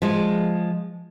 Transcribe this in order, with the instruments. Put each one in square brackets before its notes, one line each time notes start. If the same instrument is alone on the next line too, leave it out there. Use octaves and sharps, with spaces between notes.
[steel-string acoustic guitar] F3 G#3